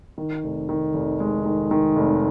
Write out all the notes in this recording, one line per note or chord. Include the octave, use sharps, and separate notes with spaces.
D#3
F1
D#3
F1
G#3
D#3
D#3
F1